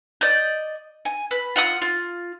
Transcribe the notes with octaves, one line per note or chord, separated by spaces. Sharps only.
D5 D#5 G6
G#5
B4
F4 F#5 D#6
F4